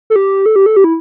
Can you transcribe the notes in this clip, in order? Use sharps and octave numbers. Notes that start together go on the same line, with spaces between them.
A4
G4
A4
G4
A4
G4
E4